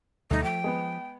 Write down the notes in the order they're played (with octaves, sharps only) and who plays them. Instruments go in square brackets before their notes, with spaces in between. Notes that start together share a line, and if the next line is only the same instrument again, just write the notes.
[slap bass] D2 B2 G3 [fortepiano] A3 [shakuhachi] D#4
[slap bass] F3 [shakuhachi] G5
[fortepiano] G#3 B3